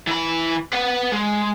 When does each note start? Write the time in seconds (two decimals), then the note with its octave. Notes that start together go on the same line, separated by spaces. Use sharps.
0.07 E3 B5
0.73 B4 F#5
1.12 G#3